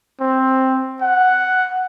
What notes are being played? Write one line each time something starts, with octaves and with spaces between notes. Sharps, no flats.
C4
F#5